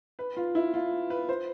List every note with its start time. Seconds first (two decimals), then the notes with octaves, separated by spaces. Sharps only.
0.19 B4
0.37 F4
0.55 E4
0.74 F4
1.10 B4
1.29 C5